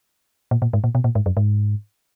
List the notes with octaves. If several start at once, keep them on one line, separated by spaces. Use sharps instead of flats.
A#2
A#2
G#2
A#2
B2
A#2
G#2
F#2
G#2